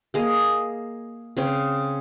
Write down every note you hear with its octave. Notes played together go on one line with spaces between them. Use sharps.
A#3 G#4 D#5
C#3 C4 C#5